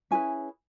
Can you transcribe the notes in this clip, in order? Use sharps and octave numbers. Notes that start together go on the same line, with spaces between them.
C#4 E4 G#4 B4 G#5